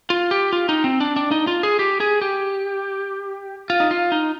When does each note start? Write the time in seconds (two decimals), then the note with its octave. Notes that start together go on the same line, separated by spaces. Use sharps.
0.10 F4
0.31 G4
0.53 F4
0.69 D#4
0.84 C4
1.00 D4
1.16 D4
1.31 D#4
1.47 F4
1.63 G#4
1.79 G4
2.00 G#4
2.22 G4
3.70 F4
3.80 D#4
3.91 F4
4.12 D#4